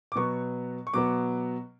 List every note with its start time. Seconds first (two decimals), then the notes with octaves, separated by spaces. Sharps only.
0.12 D6
0.15 B2 F#3 B3 C#6
0.87 C#6
0.94 B2 F#3 B3 D6